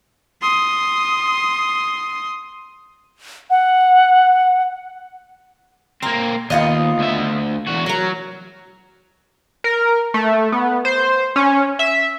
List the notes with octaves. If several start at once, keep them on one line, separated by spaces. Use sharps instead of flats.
C6 D#6
F#5
A#3 C4 A#4
D#2 B3 F4 D#5
D2 E5
E2 F#4
F#3 F#4 A#4
A#4
A3
B3
C5
C#4
E5